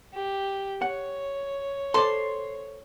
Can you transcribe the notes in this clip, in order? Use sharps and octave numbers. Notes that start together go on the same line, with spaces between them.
G4
C#5 F#5
A4 C5 D5 C6